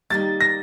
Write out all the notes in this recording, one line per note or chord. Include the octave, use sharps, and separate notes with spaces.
D#3 G3 A#3 A6
A#6